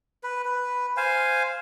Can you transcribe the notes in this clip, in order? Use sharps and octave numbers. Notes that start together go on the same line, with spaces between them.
B4
B4
C5 F5 G#5